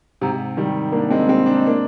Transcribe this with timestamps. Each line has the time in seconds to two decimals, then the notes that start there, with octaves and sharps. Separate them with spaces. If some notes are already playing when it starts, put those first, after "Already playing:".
0.21 G#2 C3
0.57 D#3 G3
0.92 A#3 D4
1.10 G#3 C4
1.29 G#3 C4
1.46 D4
1.56 D#4
1.67 A#3 D4